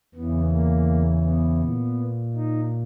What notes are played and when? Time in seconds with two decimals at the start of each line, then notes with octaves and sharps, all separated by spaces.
0.14 E2 C#3 E3 B3
0.51 A#3
1.24 B3
1.61 A#2
2.35 D#4